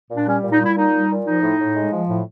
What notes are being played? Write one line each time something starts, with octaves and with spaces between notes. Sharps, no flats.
A#2
D4
G3 C#4
A#2
D#4
G3 E4
A#2 D#4
G3
A#2
F3 D#4
A2
A2
G#3
F3
A2